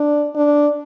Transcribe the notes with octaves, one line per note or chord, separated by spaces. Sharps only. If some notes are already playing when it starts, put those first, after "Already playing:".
Already playing: D4
D4